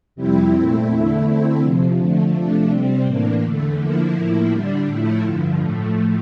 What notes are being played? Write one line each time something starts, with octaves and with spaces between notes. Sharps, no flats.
F2 C3 G3 C4 E4
A#2 A3 C4 E4
E2 D3 A3 E4
D3 A3 C4 E4
F2 C3 F3
D3 F3 A3
C3 F3 A3 D4
C3 G3 C4
A2 E3 A#3 D4
E2 D3 A3
D3 F3 A#3 E4
A2 F3 A#3 E4
D3 G3 D4
A2 F3 A3 E4
G2 D3 F3
A2 F3 A3